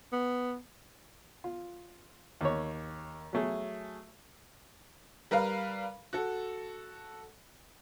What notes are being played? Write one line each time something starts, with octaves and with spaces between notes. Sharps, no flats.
B3
F4
D#2 C#5
F#3 A3 G#4
G3 A#4 B4 F5
F#4 A4